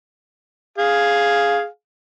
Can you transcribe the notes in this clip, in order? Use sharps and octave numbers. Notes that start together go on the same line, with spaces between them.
G#4 F5